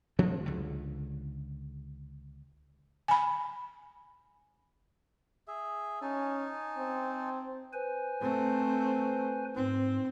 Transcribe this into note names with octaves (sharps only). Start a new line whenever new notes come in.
F3 A3 C4 D4
C#2 D3
G#5 B5
G#4 E5
C#4 D#4 G#5 A5
C4
B4 C5 G#5
A3 C4
G#2 C4